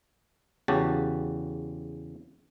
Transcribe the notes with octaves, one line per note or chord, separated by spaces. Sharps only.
E2 C#3 F#4 G4 A5